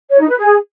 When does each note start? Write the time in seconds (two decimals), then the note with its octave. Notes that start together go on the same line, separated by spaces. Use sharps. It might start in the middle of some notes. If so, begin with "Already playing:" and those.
0.10 C#5
0.19 D#4
0.28 B4
0.38 G#4